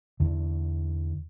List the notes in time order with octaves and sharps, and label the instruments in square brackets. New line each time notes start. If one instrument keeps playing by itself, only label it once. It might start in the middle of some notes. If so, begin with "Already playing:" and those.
[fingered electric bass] E2 D3